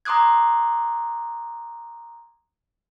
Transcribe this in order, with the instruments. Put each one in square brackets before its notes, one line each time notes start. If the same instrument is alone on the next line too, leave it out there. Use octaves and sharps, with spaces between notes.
[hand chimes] A#5 C6 D6 D#6 F#6 G#6